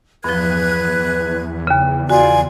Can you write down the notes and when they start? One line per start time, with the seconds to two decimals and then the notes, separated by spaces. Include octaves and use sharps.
0.24 E2 G2 F3 B4 F#6 G#6
1.67 D#2 C#3
2.10 F4 F#4 D5 G#5